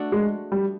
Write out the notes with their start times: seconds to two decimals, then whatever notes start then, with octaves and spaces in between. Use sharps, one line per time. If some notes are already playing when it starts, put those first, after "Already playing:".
Already playing: A3 D4 F#4
0.12 G#3
0.52 G3